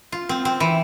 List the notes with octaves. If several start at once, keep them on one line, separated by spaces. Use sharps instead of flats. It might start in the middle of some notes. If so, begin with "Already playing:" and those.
F4
C4
C4
E3